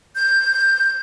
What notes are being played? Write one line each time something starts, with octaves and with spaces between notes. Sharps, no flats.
G6